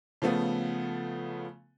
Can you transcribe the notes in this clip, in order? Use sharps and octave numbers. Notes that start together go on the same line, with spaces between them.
C#3 F3 A3 B3